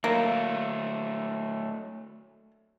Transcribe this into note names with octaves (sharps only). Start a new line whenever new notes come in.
F#3 A3 A#3